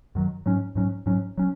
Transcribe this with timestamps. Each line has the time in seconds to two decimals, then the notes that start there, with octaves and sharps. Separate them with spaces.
0.15 F#2 D#3 F#3
0.46 G#2 F#3 C#4
0.75 G#2 F#3 C#4
1.06 G#2 F#3 C#4
1.38 F#3 C#4